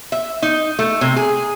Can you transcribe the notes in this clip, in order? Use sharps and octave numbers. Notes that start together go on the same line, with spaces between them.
E5
D#4
A3
C3
G#4